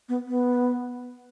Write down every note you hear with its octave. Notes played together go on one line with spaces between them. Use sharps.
B3
B3